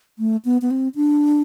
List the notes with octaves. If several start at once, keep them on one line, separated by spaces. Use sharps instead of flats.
A3
B3
B3
C4
D4